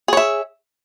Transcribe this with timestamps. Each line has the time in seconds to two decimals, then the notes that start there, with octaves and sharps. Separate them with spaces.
0.08 G#4
0.13 C#5
0.17 E5